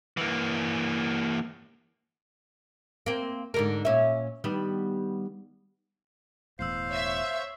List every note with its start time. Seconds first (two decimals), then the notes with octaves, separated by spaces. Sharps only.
0.17 E3 A#3
3.06 A#3 C4
3.54 G#2 D3 A#4
3.85 A#2 C#4 E5
4.44 D#3 G3 B3
6.59 E1 E2 A2 C5 F5 E6 C7
6.90 C#5 E5